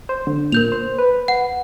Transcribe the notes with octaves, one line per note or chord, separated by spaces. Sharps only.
C5
D3
A#2 A#4 G6 F7
C5
B4
F#5